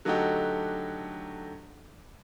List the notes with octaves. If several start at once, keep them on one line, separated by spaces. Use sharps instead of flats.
D3 F#3 A3 D#4 F#4 G4